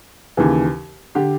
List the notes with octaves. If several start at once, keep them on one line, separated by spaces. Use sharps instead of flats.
D#2 C#3 E3
D3 G4